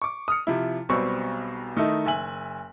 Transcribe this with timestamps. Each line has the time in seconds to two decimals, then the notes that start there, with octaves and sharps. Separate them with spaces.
0.02 C#6 D6
0.28 D#6 F6 C#7
0.47 C3 F3 E4
0.89 B1 B2 G3 C4 C#6 E6
1.77 D#3 A3 D#4 E4 A4
2.06 F#1 E5 G#5 F#7